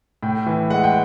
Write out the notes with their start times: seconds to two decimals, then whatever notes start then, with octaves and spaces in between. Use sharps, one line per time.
0.23 A2 G5
0.46 E3
0.70 G#3 F#5
0.84 G5